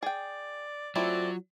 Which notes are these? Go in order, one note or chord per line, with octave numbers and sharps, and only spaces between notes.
G#4 D5 G5
F#3 A3 C4 E4 F4 D5